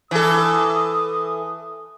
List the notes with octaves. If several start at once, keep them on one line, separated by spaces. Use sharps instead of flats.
E3 A4 D#6